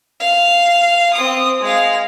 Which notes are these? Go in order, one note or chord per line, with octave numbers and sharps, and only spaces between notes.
F5
C4 D#6
G#3 F5